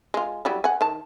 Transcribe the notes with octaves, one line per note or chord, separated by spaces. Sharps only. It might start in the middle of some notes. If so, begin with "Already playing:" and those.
G#3 F4
F#3 G3 E4
F#5 G#5
D#3 A5